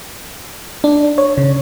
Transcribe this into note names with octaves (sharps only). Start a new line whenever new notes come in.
D4
C#5
C#3